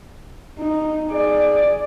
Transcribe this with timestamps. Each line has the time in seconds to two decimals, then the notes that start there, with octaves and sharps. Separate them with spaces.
0.59 D#4
1.10 G#4 D5